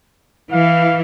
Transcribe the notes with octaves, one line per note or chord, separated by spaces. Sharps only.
E3 F5